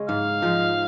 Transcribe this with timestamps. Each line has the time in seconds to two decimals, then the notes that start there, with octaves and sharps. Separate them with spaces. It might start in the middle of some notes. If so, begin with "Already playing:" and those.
Already playing: C#3 G#3 C#4
0.08 G#2 F5
0.42 F3 G#3 D#4